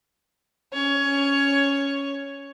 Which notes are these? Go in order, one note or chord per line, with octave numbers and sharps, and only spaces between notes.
C#4 C#5